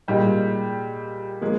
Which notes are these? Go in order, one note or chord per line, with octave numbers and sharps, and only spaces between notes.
A#2 G3 G#3 D#4
F3 G#3 A#3